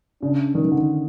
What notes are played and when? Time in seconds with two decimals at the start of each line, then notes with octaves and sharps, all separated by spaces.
0.22 C#3 D4
0.55 D#3 D#4
0.65 D#3
0.72 D3